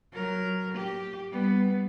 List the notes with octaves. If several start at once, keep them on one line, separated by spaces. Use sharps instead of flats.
F#3 A#4
G4
G3 B3